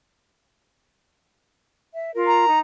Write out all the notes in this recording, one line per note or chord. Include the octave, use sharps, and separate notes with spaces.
E5
F4 A#4
A#5
D#4